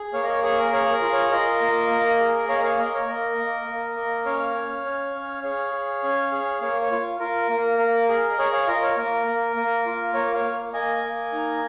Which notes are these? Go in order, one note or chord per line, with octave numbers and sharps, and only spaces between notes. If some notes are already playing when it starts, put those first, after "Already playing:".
Already playing: G#4
A#3 C#5 F5
D#5
C#5
G#4 C#5
A#4
G#4 C#5
A#4
F4
C#5
F4 A#4 D#5
A#3
A#3
G#4
A#3 C#5 F5
C#5 F5
A#3 A#4 D#5
C#5
A#3 A#4 D#5
A#3
A#3
A#3
C#4 C#5 F5
C#4
C#4
C#4
G#4 C#5 F5
G#4
C#4
G#4
A#3 C#5
C#5
F4
F4 A#4
A#3
A#3
G#4
D#5
G#4 C#5
C#5 F5
F4 A#4 D#5
C#5
A#3 A#4
A#3
A#3
F4
A#3 C#5
C#5 F5
A#3
A#3 D#5 G#5
A#3
D#4